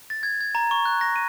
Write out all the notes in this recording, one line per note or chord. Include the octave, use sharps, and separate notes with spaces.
A6
G#6
G#6
A#5
C#6
F#6
A#6
D#7